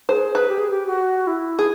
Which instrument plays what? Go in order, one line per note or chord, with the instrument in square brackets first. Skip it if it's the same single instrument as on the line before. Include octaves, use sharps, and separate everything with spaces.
[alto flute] G#4 [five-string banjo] C5
[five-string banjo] B4
[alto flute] G4
G#4
G4
F#4
E4
[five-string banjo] G#4